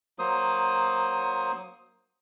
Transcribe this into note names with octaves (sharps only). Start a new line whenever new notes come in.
F#3 A#3 C5 D#6